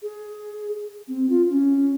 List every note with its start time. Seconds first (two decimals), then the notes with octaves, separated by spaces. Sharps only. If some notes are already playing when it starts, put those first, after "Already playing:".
0.02 G#4
1.08 C4
1.30 F4
1.50 C#4